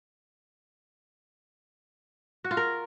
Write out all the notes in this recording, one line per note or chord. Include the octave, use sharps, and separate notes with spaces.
F#4
F4
A#4